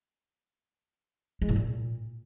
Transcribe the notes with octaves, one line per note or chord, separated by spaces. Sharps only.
G#3
A2
A#2